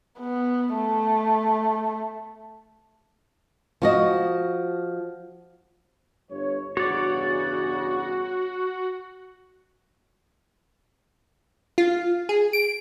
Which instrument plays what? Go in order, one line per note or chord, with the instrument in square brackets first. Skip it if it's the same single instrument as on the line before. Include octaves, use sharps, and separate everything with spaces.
[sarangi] B3
A3
[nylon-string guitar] F3 F#4 D#5
[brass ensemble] G1 G2 C#5
[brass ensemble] E2 G2 C#3 [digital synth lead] F#4 [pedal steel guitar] C#5 D5
[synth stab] F4
G#4
D7